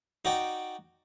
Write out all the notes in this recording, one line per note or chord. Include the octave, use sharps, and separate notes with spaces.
D#4 F#4 D5 G5